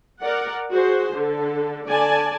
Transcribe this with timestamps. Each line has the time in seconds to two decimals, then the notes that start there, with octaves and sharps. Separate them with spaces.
0.21 A#4 D5 F#5
0.71 F#4 G#4 C5
1.15 D3 A4
1.88 D3 D5 G#5 A5